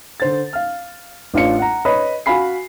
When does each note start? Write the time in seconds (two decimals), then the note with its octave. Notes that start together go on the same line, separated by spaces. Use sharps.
0.20 D3 C5 A6
0.53 F5 F6
1.34 A1 D4 F4 C#5 F5 C#7
1.59 F#5 A#5
1.85 B4 C#5 D#5 B5
2.26 F#4 F5 G#5 B5 C7